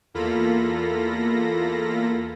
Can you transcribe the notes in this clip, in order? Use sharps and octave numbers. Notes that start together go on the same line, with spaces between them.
E2 A#3 F4 A4 B5 A#6